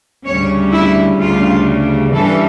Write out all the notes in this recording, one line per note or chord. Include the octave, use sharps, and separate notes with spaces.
D2 C#3 G3 C#4 C#5
E4
D2 C#3 G3 F4
G2 E3 G3 A#3 C#4 A4